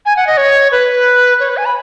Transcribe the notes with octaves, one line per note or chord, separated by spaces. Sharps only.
G#5
F#5
D#5
C#5
B4
C#5
B4
G#5
B5